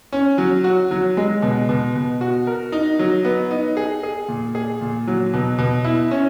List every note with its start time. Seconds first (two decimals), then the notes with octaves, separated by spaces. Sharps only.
0.13 C#4
0.38 F#3
0.64 F#4
0.91 F#3
1.17 G#3
1.42 B2
1.69 B2
1.95 B2
2.21 F#4
2.47 A#4
2.72 D#4
2.99 F#3
3.25 B3
3.51 D#4
3.77 G#4
4.03 G#4
4.28 A#2
4.55 G#4
4.81 A#2
5.07 F#3
5.33 B2
5.58 B2
5.84 E4
6.11 C#4